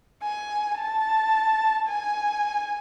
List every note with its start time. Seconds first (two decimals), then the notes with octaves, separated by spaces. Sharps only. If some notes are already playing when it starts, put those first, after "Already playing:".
0.24 G#5
0.79 A5
1.87 G#5